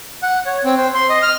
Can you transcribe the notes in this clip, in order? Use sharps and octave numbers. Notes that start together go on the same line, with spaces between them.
F#5
C#5
C4
C5
C6
D#5
F6